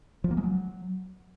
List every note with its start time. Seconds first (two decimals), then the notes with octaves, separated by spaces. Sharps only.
0.24 F3
0.31 A#3
0.37 G#3
0.44 F#3